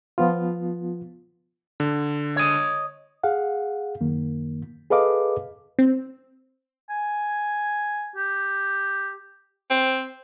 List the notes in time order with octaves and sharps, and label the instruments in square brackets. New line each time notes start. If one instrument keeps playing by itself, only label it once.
[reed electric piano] F3 B3 F4
[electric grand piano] D3
[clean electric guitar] C#5 D#5
[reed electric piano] G#4 F5 F#5
F#2 D#3 A#3
G#4 A4 B4 D#5 F5 D6
[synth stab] C4
[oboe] G#5
G4
[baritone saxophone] C4